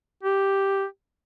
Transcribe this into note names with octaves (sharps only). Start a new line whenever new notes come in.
G4